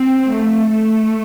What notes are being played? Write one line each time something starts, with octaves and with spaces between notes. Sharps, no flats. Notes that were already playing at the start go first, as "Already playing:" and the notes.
Already playing: C4
A3
A3